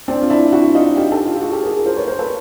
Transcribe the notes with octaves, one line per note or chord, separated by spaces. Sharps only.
C4 D4
F4
D4 E4
E4 F#4
D#4 F4
F4 G4
G4 A4
F4 G4
F#4 G#4
G4 A4
G#4 A#4
A#4 C5
B4 C#5
A#4 C5
A4 B4